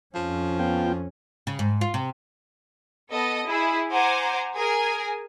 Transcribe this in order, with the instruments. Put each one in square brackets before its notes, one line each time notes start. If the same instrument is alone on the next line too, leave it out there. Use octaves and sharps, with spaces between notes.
[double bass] F2 C#4 [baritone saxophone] F3
[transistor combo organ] B3 F4 G5
[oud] C#3
G#2
F4
C3
[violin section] B3 A4 D#5
E4 G#4
C5 F#5 G#5 A#5 D6
G#4 A#4 G#5